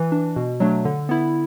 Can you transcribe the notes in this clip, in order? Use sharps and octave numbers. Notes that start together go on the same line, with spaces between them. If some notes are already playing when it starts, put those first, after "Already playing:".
Already playing: E3
D4
B2
F#3 A3 D4
D3
B3 E4